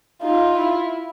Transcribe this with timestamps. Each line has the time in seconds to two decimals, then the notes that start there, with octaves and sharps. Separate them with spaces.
0.22 D#4 F4
0.58 E4